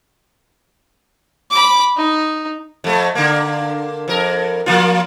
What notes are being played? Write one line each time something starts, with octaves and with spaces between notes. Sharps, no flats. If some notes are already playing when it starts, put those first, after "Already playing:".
B5 D6
D#4
F2 A3
D3 A#3
F2 A#4
F3 A#3 F4